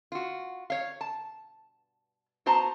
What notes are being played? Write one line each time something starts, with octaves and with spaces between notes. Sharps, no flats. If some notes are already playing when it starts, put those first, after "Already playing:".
F4 F#4
C#5 F5
A5
B3 F#4 C5 A5 A#5